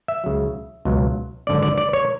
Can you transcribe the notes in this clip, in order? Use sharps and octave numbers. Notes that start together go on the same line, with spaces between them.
E5
C#2 C#3 F#3
C#2 B2 F#3
G#1 F#2 D3 F#3 D5
D5
D5
C#5